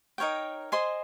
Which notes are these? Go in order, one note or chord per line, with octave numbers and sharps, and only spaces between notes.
D#4 A#4 C#5 G5
C5 D#5 G#5 C6